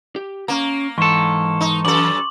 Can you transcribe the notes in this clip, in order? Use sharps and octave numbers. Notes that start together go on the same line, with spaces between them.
G4
A#3 C#4 A#5
G#2 E3 A4 C6 C#6
D#4
F#2 A4 D6 F#7